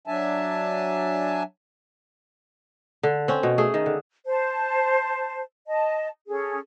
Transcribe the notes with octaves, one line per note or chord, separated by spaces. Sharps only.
F#3 D4 E5 G#5 A5
D3
C4 C#4
B2
A3 G#4
D#3
D3
C5 A5
D#5 A5
C#4 G#4 A4